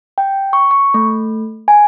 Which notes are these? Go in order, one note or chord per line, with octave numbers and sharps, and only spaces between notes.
G5
C#6
C#6
A3
G#5